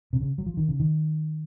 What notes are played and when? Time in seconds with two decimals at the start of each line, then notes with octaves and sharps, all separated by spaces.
0.13 C3
0.21 C#3
0.38 F#3
0.46 F3
0.57 D#3
0.68 C#3
0.80 D#3